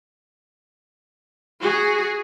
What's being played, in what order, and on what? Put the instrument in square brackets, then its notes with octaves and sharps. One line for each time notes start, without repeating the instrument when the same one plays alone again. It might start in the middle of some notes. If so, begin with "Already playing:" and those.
[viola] F#4 G#4